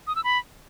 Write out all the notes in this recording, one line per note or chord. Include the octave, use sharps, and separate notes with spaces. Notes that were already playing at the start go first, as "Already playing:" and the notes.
D#6
E6
B5